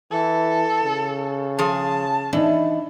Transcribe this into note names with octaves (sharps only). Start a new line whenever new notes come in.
E3 A4
C#3
F3 G#4 A5
E3 D4 D#4